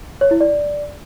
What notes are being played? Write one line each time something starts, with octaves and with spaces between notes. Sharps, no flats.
C#5
E4
D5